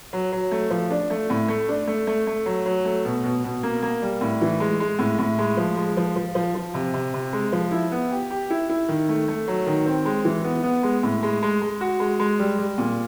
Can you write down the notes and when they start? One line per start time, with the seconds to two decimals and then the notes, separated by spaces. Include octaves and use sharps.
0.13 F#3
0.32 F#3
0.51 A3
0.70 F3
0.90 D4
1.10 A3
1.30 A2
1.48 A3
1.69 D4
1.87 A3
2.07 A3
2.27 A3
2.46 F#3
2.66 F#3
2.85 A3
3.05 B2
3.24 B2
3.44 B2
3.63 A#3
3.82 A#3
4.02 G3
4.21 A2
4.41 E3
4.60 G#3
4.80 G#3
4.99 A2
5.19 A2
5.39 G#3
5.57 F3
5.77 G#3
5.97 F3
6.16 F3
6.35 F3
6.55 F3
6.74 C3
6.93 C3
7.14 C3
7.33 G#3
7.52 F3
7.72 E4
7.92 B3
8.11 G4
8.30 G4
8.50 E4
8.69 E4
8.88 D#3
9.09 A3
9.28 A3
9.48 F#3
9.67 D#3
9.86 C4
10.05 G#3
10.25 E3
10.44 B3
10.63 B3
10.83 G#3
11.03 A2
11.23 G#3
11.42 G#3
11.62 G#3
11.81 F#4
12.00 G#3
12.19 G#3
12.39 G3
12.58 G3
12.78 A#2